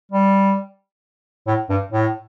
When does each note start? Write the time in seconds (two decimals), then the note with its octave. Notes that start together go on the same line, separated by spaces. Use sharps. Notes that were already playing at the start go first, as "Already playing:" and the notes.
0.12 G3
1.47 A2
1.70 G2
1.92 A2